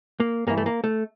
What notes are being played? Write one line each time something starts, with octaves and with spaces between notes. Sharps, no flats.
A#3
G2 E3 A#3
A3
A#3
A3